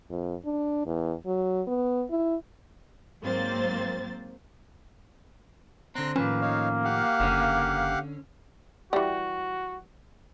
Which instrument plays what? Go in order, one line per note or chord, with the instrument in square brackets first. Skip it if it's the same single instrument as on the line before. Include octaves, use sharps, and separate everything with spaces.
[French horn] F2
D4
E2
F#3
B3
E4
[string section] G#2 F#3 A#3 C4 C5 A6
[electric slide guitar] D3 C4 [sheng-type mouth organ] A#5 C6 F#6
[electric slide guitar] A2 D#3 F3 [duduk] A#3 [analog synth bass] C#4 [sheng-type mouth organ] B4
[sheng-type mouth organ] D#4 C#5 F5
G4 F5 F#5
[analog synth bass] F#1 [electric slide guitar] D3 C#4
[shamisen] E3 G3 [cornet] F#4